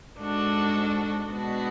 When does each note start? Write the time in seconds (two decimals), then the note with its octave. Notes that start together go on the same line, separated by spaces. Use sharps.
0.18 G#2 G#3 D4 F#4 A4
1.32 B2 G#3 B3 D4 F#4